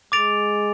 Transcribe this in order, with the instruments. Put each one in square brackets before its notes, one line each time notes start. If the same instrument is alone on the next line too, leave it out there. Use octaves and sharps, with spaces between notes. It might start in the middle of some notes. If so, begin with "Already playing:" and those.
[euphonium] G#3 [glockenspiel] D6 A6 D7 F7